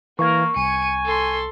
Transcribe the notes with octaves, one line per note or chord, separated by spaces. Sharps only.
E3 A#3 A#4 F5 C#6 G#6
C2 G#5 C#7 D#7
A4 C6